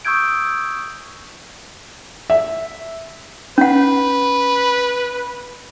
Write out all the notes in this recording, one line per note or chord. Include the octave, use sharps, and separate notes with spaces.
C#6 D#6 E6 G6 G#6 D7
E5
C#4 B4 F#5